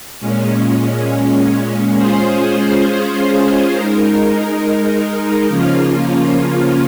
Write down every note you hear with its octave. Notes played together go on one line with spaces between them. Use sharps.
A#2 G#3 C#4
G#3 C#4 F4 G#4 C5
G#3 D#4 A#4
C#3 F3 A#3 C#4 F4